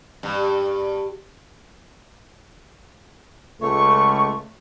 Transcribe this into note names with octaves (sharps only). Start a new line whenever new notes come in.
G2
C#2 A3 C#6